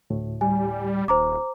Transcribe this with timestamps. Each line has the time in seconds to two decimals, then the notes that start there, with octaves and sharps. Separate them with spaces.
0.10 D2 A2
0.41 G3 G#5
1.08 D#1 C5 A#5 D6